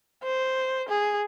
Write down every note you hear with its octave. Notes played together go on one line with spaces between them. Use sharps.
C5
G#4